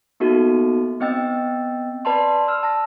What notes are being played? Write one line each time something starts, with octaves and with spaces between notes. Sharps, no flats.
A#3 B3 D#4 F#4 A4
B3 C4 D#5 G5 E6 A6
B4 D5 A5 B5 C6
E6 F6
A5 A#6